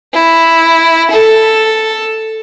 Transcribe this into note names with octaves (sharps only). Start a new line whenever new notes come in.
E4
A4